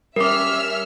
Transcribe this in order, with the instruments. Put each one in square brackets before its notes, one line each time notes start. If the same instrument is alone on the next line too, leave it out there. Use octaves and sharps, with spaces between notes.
[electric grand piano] G3 C#4 [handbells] A#4 D6 [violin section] E5 E6 F6